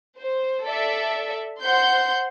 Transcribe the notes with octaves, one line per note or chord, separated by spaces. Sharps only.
C5
A4 D5 E5
C5 F#5 C6 G6